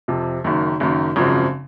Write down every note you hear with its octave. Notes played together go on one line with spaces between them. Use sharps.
F2 C3 F3
F#1 F#2 D#3
F#1 F#2 D#3
G#1 F#2 C#3 F3 C4